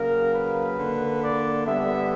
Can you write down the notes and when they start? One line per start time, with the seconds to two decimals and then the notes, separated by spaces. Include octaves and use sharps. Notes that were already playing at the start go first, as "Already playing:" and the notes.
Already playing: C#3 F#3 A#3 A#4
0.33 B4
0.77 D3 A#3
1.21 D5
1.65 D3 G3 B3 E5